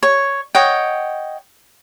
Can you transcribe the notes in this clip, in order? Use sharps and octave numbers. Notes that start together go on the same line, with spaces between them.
C#5
C#5 D#5 F#5 G5